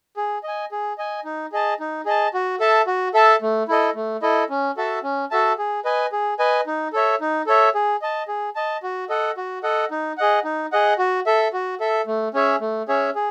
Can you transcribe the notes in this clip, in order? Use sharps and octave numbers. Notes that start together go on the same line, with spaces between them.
G#4
D#5 G#5
G#4
D#5 G#5
D#4
G#4 D#5 A5
D#4
G#4 D#5 A5
F#4
A4 E5 A5
F#4
A4 E5 A5
A3
E4 A4 D#5
A3
E4 A4 D#5
C#4
F#4 A4 E5 A5
C#4
F#4 A4 E5 A5
G#4
B4 D#5 G#5
G#4
B4 D#5 G#5
D#4
A4 C#5 E5
D#4
A4 C#5 E5
G#4
D#5 A5
G#4
D#5 A5
F#4
A4 D#5 F#5
F#4
A4 D#5 F#5
D#4
G#4 D#5 F#5
D#4
G#4 D#5 F#5
F#4
A4 E5
F#4
A4 E5
A3
C#4 G#4 C#5 E5
A3
C#4 G#4 C#5 E5
G#4